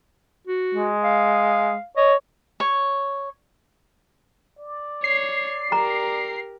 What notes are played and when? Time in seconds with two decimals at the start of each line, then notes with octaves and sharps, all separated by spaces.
0.47 F#4
0.74 G#3
1.03 F5
1.97 C#5 D#5
2.60 C#5
4.59 D5
5.04 C#5 C7
5.72 G4 A#4 A#5